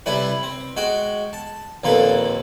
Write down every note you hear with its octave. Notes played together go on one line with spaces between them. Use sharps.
C3 G3 E4 B4
C4
G#3 F#4 G5
A5
A#1 D#2 A#3 C4 A4 B4